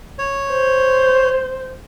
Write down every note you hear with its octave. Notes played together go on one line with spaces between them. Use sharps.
C#5
C5